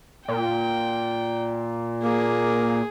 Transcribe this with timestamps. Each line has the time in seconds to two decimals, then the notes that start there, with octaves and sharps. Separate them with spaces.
0.28 A#2 G5
2.04 A#3 G#4